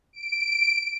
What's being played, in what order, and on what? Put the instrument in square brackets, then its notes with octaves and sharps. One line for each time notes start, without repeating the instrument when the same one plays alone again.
[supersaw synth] D7